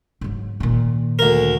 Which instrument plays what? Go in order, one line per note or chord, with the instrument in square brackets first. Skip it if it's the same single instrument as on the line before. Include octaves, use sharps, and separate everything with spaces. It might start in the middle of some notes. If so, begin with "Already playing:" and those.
[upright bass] G#2 F#3
A#2 D#3
[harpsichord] D2 A#4